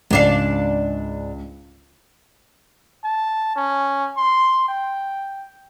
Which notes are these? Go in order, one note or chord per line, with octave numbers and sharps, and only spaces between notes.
C#2 G#2 D4 F5
A5
C#4
C6
G5